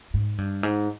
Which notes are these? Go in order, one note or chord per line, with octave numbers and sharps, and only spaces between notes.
G#2
G2
G#2